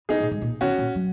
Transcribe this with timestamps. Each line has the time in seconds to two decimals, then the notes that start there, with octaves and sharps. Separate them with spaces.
0.09 C#3 D#4 G#4
0.20 A#2
0.31 G#2
0.42 A#2
0.61 D#3 C#4 F#4
0.78 A#2
0.95 F#3